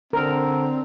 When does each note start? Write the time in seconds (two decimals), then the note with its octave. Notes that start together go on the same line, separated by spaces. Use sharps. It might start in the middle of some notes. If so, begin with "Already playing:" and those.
0.13 D3 C4 A#4